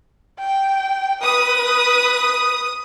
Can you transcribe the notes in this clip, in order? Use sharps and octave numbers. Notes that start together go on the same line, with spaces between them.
G5
B4 D#6